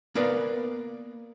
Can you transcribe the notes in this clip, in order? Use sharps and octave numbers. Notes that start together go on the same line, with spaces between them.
A#3 B3 A#4 B4 D5 F5